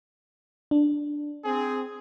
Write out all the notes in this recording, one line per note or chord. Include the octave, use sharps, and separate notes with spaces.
D4
C4 G#4